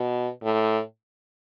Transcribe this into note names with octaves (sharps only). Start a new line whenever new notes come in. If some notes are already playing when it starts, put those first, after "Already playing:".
Already playing: B2
A2